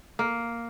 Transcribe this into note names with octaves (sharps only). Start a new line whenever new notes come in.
A#3